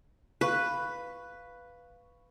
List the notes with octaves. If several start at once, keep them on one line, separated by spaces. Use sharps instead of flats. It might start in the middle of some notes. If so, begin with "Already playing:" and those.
B4 F5 C#6 F#6